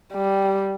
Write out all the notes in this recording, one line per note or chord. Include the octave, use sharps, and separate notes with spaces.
G3